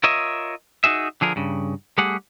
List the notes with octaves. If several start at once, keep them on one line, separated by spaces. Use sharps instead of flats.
F4 A#4 C#5 D#5 E5
D#4 F#4 G#4 E5
D3 F3 G#4 A#4
G2 C#3
G3 A3 G4 G#4 F#5